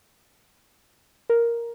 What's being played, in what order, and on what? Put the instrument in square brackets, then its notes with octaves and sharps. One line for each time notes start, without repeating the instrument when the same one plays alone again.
[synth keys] A#4